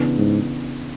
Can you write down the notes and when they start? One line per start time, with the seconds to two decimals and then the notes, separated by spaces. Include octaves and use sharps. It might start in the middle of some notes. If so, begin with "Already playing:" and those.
Already playing: C#3 E3 B3 D4
0.17 G#2